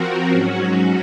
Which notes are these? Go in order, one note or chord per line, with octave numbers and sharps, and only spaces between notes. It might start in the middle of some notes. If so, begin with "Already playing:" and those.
Already playing: F3 C4 F#4 A#4
G#2 F#3 C#4 F#4